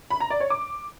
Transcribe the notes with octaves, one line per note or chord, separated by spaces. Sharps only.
B5
A#5
D5
C#5
D6